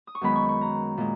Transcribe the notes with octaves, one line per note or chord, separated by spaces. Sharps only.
D#6
C#6
F#2 D#3 G#3 B3 B5
C#6
C#6
A#5
A#2 G#3